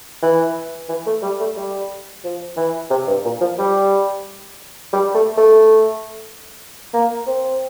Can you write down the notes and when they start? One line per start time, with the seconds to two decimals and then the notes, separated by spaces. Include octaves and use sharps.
0.23 E3
0.89 E3
1.07 A3
1.22 G3
1.40 A3
1.57 G3
2.24 F3
2.57 E3
2.91 C3
3.07 G2
3.25 A#2
3.41 F3
3.59 G3
4.93 G3
5.15 A3
5.38 A3
6.94 A#3
7.27 C4